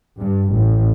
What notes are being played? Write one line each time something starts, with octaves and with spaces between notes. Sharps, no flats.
G2
A1